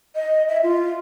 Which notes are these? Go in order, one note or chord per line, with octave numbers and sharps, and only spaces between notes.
D#5
E5
F4